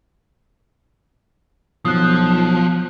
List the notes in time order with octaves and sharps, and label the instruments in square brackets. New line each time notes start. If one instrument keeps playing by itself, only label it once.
[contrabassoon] B1 [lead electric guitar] F3 [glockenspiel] D#6 F#6